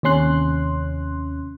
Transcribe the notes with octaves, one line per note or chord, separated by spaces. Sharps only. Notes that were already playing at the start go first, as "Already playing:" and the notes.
D#2 C3 C#4 C6 F#6